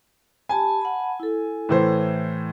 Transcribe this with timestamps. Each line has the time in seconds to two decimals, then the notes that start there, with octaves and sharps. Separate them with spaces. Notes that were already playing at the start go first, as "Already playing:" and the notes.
0.49 G4 G#5 A5 B5
0.81 F#5 A5 B5
1.20 E4 A4
1.69 A2 E3 C5